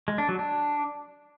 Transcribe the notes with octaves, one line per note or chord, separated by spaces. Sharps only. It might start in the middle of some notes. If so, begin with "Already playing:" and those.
G#3
D4
F#3
D4